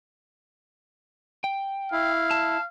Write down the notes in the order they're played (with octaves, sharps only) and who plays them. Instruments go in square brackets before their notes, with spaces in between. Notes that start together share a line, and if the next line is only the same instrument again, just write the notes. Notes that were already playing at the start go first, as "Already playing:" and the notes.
[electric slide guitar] G5
[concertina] E4 [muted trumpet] F5
[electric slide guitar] A5